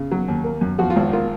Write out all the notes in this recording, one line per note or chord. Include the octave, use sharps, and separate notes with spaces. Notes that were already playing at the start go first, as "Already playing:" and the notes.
Already playing: C#3
F#3
D#2
A#3
F#2
F3 F#4
F4
G#1
A#3 F4